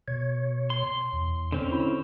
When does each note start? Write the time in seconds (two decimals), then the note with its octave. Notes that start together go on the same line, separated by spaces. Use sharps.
0.08 B2 C#5
0.70 C6
1.13 E2
1.52 D3 C4 C#4
1.71 E4